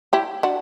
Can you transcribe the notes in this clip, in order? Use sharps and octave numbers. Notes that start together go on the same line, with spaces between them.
E4 G4
D4 F#4